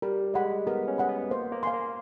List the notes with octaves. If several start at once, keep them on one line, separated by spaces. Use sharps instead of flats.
G3 A#4
G#3 D#5 F#5 B5
B3 A#4
C#4
D#5 F#5 B5
B3
A#3 C5
A#3
F5 G#5 C6
A#3